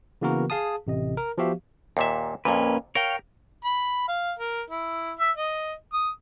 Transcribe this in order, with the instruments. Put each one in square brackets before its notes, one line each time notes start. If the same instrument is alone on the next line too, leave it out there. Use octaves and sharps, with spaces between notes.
[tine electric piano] C#3 E3 A#3 B3 F#4 A#4
G#4 F5 A5 D#6
A1 C3 D#5
A#4
F3 B3 F#4 G4 E5 F5
[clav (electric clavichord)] D#2 A#2 E5
[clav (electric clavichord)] F2 A#2 [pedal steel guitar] A#3 C#4 B4
[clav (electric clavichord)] A#4 [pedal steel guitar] C#5 F5 G5
[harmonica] B5
F5
A#4
E4
E5
D#5
D#6